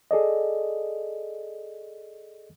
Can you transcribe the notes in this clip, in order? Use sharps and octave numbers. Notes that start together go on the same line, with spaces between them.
G#4 A4 D5 D#5